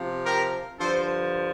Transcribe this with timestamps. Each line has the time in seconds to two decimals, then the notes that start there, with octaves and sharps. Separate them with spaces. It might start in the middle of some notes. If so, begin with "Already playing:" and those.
Already playing: C3 F3
0.24 G4 A#4
0.78 G2 D3 F3 A4 C5